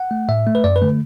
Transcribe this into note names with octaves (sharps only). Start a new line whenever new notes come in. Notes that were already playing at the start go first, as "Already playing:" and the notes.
Already playing: F#5
A3
A2 E5
A3
B4
F#2 D5
B4
D3 A3